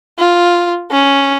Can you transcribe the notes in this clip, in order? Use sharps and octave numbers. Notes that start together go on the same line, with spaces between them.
F4
C#4